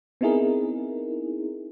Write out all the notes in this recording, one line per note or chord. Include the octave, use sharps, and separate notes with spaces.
B3 C4 D#4 E4 G#4 A#4